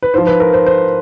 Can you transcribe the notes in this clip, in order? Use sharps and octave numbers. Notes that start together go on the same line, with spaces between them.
B4
G#2 F3 C5
B4
A#4
C5
C5